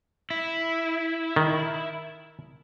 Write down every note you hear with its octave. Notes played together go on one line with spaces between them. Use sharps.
E4
D#3